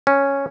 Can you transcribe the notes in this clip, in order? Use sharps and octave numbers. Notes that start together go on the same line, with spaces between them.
C#4